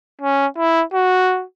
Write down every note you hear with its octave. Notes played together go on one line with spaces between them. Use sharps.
C#4
E4
F#4